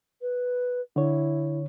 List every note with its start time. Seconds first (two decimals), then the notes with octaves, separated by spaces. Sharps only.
0.21 B4
0.96 D3 E4 C#5